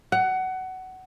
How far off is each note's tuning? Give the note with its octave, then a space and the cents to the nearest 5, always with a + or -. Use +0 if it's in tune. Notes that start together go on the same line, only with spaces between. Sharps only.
F#5 +20